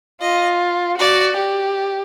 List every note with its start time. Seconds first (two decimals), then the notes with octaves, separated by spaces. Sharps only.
0.21 F4 D#5
0.98 F#4 D5
1.38 G4